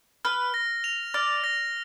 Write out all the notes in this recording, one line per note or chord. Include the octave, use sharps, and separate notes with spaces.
B4 F6
A#6
F7
D5 F6
A#6